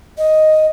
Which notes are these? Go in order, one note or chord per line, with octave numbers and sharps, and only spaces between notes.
D#5